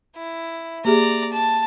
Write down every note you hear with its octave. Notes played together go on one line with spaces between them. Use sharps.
E4
A#3 G4 G#4 D5 A#5
A5